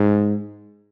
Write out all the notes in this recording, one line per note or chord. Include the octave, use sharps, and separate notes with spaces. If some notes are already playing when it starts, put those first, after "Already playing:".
Already playing: G#2